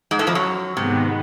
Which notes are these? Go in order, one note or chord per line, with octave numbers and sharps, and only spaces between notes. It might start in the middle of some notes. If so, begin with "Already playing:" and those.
G#2 G#3
A2 A3
F2 F3
F#2 F#3
G#2 C3 D#3 G#3 B3